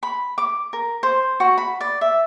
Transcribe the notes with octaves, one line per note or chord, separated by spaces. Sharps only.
B5
D6
A#4
C5
F#4
B5
D5
E5